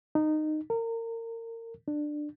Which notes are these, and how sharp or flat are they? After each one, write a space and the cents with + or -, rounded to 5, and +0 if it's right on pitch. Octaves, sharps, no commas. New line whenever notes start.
D#4 -15
A#4 -30
D4 +15